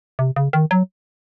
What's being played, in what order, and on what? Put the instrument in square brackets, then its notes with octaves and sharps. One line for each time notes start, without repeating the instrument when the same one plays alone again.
[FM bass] C3
C#3
D#3
F#3